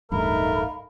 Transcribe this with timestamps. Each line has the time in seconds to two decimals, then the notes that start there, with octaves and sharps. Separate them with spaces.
0.12 D1 A1 G2 A3 D#4 A#4 F5 B5